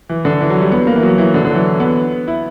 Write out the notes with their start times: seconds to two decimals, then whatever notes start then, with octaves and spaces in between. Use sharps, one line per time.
0.09 E3
0.25 D3
0.41 E3
0.50 F#3
0.62 G3
0.72 B3
0.87 A#3
0.96 E3
1.03 F#3
1.18 E3
1.34 D3
1.45 D3
1.51 F#3
1.55 E3
1.80 B3
2.28 E4